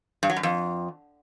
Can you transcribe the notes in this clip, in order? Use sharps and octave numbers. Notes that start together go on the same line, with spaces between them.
G2
F#3
F#2
F2